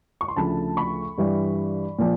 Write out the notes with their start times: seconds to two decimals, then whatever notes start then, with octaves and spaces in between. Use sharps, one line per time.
0.21 C#6
0.28 C6
0.36 D2 C#3 F3 A3 A5 B5
0.77 B5 C#6
1.18 G2 E3 G3
1.99 A#2 F3